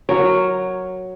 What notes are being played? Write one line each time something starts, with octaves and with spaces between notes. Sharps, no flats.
F#3 A#4 C#5